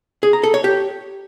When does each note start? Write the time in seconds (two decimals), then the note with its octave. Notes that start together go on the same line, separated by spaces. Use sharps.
0.23 G#4
0.33 A#5
0.44 A4
0.54 C#5
0.64 G4